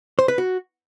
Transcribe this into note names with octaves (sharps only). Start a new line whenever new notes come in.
C5
B4
F#4